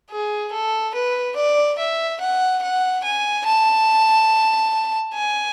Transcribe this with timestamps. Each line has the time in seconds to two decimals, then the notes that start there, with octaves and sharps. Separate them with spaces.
0.11 G#4
0.52 A4
0.94 B4
1.36 D5
1.78 E5
2.20 F#5
2.62 F#5
3.04 G#5
3.46 A5
5.14 G#5